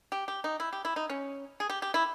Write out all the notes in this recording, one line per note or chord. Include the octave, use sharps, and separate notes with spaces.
G4
G4
D#4
E4
G4
E4
D#4
C#4
G#4
G4
G4
E4